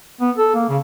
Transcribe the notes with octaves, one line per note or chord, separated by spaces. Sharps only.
B3
A4
A#3
C#3